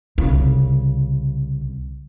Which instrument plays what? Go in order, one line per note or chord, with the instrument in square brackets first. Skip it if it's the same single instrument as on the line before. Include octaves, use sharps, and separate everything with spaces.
[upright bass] C2 C#3